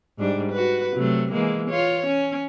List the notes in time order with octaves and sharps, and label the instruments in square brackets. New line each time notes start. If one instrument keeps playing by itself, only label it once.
[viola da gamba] G#2 G3 D4
F#4 B4
C3 F#3 A3
E3 G#3 A#3
F4 C#5
C#4